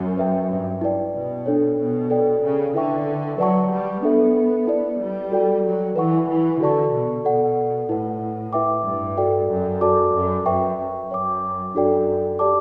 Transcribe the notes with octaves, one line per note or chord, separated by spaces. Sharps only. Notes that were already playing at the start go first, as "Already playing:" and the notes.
Already playing: F#2
B4 E5 G5
G2
E4 B4 D5 G5
B2
D4 A4 C#5
B2
A4 D5 G5
C#3
D3 E4 B4 E5 G5 C#6
F#3 B4 D5 F#5 A5 C#6
G3
B3 D4 A4 E5
E4 B4 D5
G3
F#4 A4 D5 G5
F#3
E3 B4 F#5 C#6
E3
D3 F#4 A4 D5 A5 C#6
B2
B2 A4 D5 F#5
A2 E4 B4 F#5
E4 B4 E5 G5 D6
G2
F#4 A4 D5 G5
F#2
F#4 A4 D5 A5 D6
F#2
F#2 B4 E5 G5 C#6
F#2 C#5 G5 D6
F#2 D4 F#4 A4 D5 G5
G4 D5 A5 D6